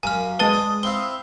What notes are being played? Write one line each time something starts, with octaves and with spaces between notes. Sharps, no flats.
F#2 A#3 G#5 F6
G#3 D4 B4 A5 D#6 A6
D5
C4 E4 F5 G7